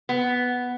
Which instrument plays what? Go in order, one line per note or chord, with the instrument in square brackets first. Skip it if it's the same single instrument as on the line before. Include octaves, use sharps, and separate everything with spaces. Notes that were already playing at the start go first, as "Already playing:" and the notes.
[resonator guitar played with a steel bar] B3